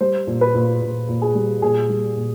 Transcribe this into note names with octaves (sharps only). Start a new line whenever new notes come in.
G3 C5
A#2
B4
A#2
A#2
A#2
G#4
G3
A#2 G#4
G3
A#2